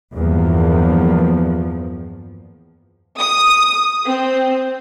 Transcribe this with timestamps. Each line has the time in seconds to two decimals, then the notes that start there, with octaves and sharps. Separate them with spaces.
0.14 E2 G2 D#3 F3 A#3
3.20 D#6
4.06 C4